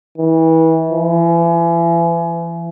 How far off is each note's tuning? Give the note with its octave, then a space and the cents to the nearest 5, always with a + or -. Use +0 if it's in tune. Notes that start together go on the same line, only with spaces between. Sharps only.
E3 -30
E3 +40